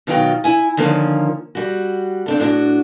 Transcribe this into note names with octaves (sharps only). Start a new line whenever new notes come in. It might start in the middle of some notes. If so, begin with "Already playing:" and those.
B2 D#3 F#3 F4 G5
E4 G#5
D3 D#3 F3 A#3 C#4
G3 F#4
C4 D4 A4
A2 D4 F#4